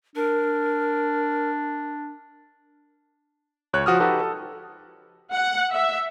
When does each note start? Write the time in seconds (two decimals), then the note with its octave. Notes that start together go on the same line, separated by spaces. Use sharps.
0.16 D4 A#4
3.73 C#2 C#5 F#6
3.86 F3 F#4 D#6 F6
4.00 D#4 F#4 G4 A4 B4
4.20 A4
5.33 F#5
5.71 E5